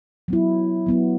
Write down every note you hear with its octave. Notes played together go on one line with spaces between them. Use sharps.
F#3 B3 E4
F#3 B3 E4